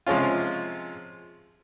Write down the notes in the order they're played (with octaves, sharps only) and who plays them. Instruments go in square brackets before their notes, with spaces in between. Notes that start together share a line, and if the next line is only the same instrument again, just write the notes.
[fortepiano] C3 F3 G#3 C#4 F4